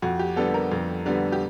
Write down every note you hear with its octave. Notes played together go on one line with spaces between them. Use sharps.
F2 F#4
G4
D3 G3 B3 A4
A#4
F2
D3 G3 B3
G4